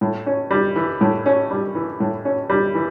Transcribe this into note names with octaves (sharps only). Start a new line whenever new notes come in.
A2
C#4
G3
E3
A2
C#4
G3
E3
A2
C#4
G3
E3